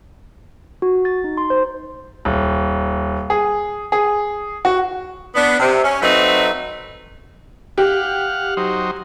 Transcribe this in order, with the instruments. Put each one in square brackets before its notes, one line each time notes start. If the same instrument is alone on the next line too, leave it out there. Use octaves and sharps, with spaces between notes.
[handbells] F#4
A6
D#4
C6
C5
[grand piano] D#1
G#4
G#4
F#4
[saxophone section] B3 D4
C3
C#4
F#3 A3 C4 D#4 B4
[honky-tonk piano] G4 [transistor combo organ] F5 F#5
[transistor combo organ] F#3 D#4 C5